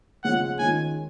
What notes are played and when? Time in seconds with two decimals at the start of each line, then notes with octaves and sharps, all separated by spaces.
0.24 C#3 F3 G#3 C#4 F4 F#5
0.59 D#3 G#3 C#4 F4 G#5